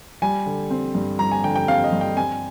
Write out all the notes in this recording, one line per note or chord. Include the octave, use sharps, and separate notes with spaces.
G3 G#5
D3
C4
G2
G3 A#5
G#5
D3 G5
G5
C4 F5
D#5
G2
G5
C4 G#5